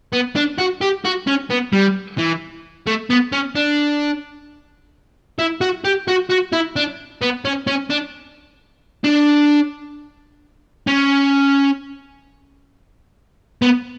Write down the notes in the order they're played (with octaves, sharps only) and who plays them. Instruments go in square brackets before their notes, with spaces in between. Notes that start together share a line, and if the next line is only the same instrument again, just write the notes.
[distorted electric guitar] B3
D4
F#4
G4
F#4
C#4
B3
G3
E3
A3
B3
C#4
D4
E4
F#4
G4
F#4
F#4
E4
D4
B3
C#4
C#4
D4
D4
C#4
B3